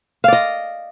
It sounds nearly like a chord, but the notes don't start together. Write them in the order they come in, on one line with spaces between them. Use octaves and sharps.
F5 D5 D#5